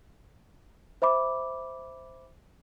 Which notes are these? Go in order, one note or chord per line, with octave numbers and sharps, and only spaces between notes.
C5 E5 B5 D6